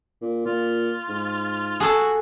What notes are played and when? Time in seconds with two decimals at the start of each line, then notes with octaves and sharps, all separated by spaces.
0.22 A#2
0.46 A#2 F4
1.09 G#2
1.80 F#4 G#4 A4